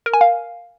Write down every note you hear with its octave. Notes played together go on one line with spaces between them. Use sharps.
A#4
G#5
F5